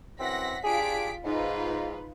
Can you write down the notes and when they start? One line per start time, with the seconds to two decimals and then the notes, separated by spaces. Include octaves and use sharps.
0.19 F#2 E3 C4 F#5 A#6 B6
0.64 D4 F4 G4 G#4 B6 D7
1.24 G#2 D#4 F4 B4